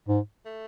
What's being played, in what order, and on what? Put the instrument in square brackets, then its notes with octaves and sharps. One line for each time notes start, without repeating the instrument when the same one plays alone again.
[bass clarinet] G#2
[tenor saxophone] A3